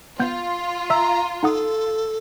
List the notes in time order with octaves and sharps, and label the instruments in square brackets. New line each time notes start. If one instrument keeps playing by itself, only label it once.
[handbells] B3 G6 [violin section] F4
[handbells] E5 E6 [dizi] A#5
[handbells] D#4 F#5 D#6 [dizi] A4